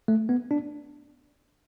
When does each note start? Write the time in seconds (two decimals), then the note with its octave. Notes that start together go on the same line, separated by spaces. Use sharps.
0.08 A3
0.29 B3
0.51 D4